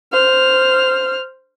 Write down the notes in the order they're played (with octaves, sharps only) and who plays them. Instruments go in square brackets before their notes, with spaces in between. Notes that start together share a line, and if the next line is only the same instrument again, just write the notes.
[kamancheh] C5 F6